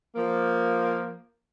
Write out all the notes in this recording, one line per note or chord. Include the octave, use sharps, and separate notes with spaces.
F3 A#3